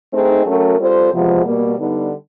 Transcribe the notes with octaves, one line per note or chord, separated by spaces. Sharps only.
A3 C4 D#4 G#4
F#3 A3 C#4 F#4 A#4
G3 C4 F4 A4 C5
E2 C3 F3 G#3 B3
B2 G3 A#3
D3 G3 B3 D#4